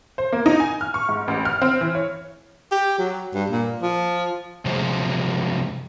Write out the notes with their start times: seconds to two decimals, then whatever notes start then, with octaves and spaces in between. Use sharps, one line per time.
0.18 C5
0.33 A#3
0.46 D#4
0.60 G#5
0.81 F6
0.94 C#6
1.09 G#2
1.28 A1
1.45 F6
1.62 C4
1.81 E3
1.95 C#5
2.71 G4
2.98 F#3
3.34 G2
3.50 A#2
3.82 F3
4.65 C3 F3 F#3 G#3 C5